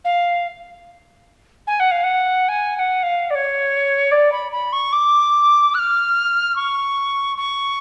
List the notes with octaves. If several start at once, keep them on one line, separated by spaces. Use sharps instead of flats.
F5
G#5
F#5
F5
F#5
G#5
G#5
F#5
F5
D5
C#5
D5
B5
B5
C#6
D6
F#6
F6
C#6
C#6